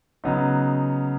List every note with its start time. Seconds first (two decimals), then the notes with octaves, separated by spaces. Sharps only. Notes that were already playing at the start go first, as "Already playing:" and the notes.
0.24 C#3 F#3 B3 D#4